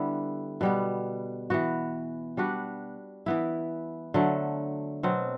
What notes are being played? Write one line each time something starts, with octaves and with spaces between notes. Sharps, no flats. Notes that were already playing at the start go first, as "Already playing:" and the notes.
Already playing: D3 G3 B3 E4
B2 G3 B3
E3 B3 F#4
G3 D4 F#4 B4
E3 B3 E4
D3 F#3 A3
B2 F#3 C4